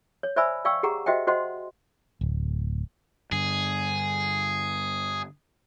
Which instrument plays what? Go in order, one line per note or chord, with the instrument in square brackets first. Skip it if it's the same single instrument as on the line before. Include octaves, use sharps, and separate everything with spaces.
[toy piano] C#5
C5 D5 E5 G#5 B5 E6
D5 F5 G5 C#6 E6
G4 G#4 F#5 A#5
F#4 C5 D#5 E5 F#5 G5
F#4 C5 D#5 F#5 C6
[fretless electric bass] D1
[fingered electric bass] G2 D3 [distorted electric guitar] G#4